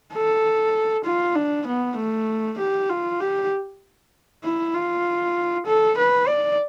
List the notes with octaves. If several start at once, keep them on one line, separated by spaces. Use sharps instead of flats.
A4
F4
D4
B3
A3
G4
F4
G4
E4
F4
A4
B4
D5